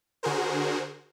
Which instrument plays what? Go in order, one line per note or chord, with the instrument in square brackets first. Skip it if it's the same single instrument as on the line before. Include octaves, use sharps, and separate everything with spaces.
[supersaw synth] D3 F#4 G#4 A#4 C5